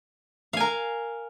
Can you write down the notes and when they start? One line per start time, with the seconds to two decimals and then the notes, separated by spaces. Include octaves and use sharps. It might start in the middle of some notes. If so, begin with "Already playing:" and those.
0.53 F5
0.57 G#5
0.60 A#4